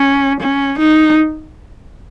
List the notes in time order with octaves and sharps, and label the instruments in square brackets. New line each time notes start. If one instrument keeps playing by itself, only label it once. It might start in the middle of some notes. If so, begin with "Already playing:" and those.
Already playing: [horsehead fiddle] C#4
C#4
D#4